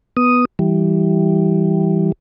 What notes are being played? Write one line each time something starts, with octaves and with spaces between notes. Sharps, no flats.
B3 D#6
E3 G3